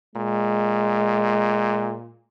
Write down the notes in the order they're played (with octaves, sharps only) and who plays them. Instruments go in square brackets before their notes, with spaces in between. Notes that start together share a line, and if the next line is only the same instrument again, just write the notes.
[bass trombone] A#2 [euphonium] G#3